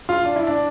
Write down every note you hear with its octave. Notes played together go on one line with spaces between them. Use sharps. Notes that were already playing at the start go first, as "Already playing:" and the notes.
F4
D4
E4
D4